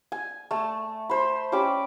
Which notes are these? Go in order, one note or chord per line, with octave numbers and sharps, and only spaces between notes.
G#5
A3 A5
C5 B5
C#4 G4 B5 D6